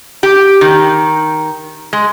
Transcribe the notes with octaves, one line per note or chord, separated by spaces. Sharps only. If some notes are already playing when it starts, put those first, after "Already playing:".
G4
D#3
G#3